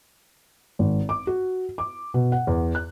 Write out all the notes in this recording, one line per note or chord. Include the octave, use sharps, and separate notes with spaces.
G#1
D6
F#4
D6
B2
F#5
E2
F#6